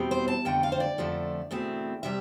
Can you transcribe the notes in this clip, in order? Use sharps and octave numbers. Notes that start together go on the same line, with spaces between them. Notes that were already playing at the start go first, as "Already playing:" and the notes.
Already playing: E2 B2 G3 C4
C5
A5
F2 D3 A3 G5
F5
C5
D5
F2 D3 F3 A3
E2 B2 A3 C4
C3 G3 E5